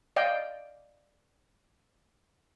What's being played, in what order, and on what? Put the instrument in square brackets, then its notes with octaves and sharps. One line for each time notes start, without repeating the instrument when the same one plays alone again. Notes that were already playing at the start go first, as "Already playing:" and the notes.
[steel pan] D5 D#5 F5 G5